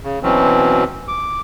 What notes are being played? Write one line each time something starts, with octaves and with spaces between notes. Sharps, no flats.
C#3
B2 E3 F#3 C4 C#4
D6